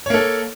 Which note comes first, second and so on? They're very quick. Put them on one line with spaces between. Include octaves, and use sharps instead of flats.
C#5 A#3 A4